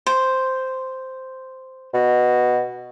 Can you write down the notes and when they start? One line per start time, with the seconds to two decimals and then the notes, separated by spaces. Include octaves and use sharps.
0.07 C5
1.94 B2